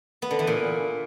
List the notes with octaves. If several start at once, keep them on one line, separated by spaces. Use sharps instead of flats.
B3
D3
E3
A#2